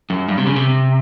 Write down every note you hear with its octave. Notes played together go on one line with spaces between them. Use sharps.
F#2
G2
C3
C#3
C3